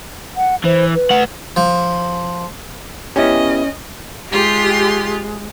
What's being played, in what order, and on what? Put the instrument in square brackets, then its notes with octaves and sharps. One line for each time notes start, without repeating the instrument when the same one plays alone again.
[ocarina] F#5
[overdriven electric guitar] E3 [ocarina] C5
[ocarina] B4
[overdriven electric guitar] A3 F#5
[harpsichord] F3
[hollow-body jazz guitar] B3 E4 G4 [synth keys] C#4 [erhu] D#5
[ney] G#3 [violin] F4 C6 [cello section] G4